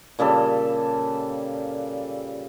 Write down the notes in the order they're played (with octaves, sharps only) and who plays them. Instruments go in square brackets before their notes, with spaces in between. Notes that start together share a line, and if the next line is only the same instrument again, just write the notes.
[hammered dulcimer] A#2 C#3 G3 A4